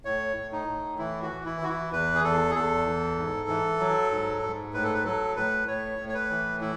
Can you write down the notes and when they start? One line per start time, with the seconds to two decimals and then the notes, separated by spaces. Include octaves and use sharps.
0.05 A2 C#5
0.36 A2
0.52 D#4
0.67 A2
0.98 E3 E4
1.22 F#4
1.30 E3
1.46 E4
1.61 E3 F#4
1.69 E4
1.92 E2 B4
2.15 G#4
2.24 E2 A4
2.50 G#4
2.55 E2 A4
2.86 E3
3.18 G#2
3.48 E3
3.80 F#3
4.11 G#2
4.42 G#2
4.74 A2 B4
4.84 A4
4.94 B4
5.04 F#3 A4
5.36 A2 B4
5.67 A2 C#5
5.99 A2
6.09 C#5
6.14 B4
6.30 E3
6.61 E4